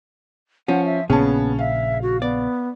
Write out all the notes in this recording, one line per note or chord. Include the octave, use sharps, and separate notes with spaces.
F3 C#4 F#5
E5
A#1 A#2 C#3 B3 C#4 G#4 A5
E5 F5
F#4
B3 D5